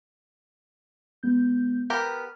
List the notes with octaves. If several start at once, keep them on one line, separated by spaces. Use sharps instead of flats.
G#3 B3 G6
B3 G4 A#4 F6